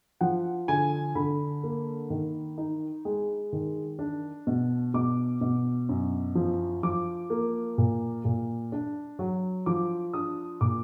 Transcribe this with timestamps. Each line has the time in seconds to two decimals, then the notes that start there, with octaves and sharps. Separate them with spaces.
0.21 F3 F#5
0.68 D3 G#5
1.15 D3 B5
1.63 A#3
2.10 D#3
2.58 D#4
3.05 G#3
3.53 D#3
3.99 D4
4.47 B2
4.94 B2 D6
5.41 B2
5.89 F#2
6.35 F3
6.83 F3 D6
7.30 A#3
7.78 A#2
8.25 A#2
8.72 D4
9.19 F#3
9.66 F3 D6
10.13 D4 D#6
10.61 A#2 D6